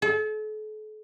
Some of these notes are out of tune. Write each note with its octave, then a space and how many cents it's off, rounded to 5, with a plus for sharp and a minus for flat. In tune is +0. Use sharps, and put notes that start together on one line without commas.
A4 -40